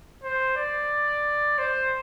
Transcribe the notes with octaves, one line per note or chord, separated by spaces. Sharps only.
C5
D5
C5